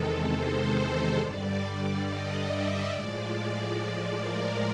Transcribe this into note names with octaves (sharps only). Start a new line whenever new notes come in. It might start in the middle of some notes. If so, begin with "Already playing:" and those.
Already playing: E2 C3 D#3 G#3 A4
C5
G2 D3 G3 D5
D5
D#5
E5
A2 F3 G#3 D5
D5
A#4